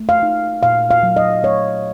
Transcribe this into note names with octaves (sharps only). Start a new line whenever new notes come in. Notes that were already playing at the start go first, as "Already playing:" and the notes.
Already playing: A3
F5
D#4
A#2 F5
F5
F#3
D#5
A3 C#5